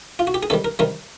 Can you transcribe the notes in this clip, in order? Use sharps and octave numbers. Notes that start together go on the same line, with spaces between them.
F4
F#4
G4
G#4
C3 D#3 G3 A4
A#4
C3 D#3 G3 A#4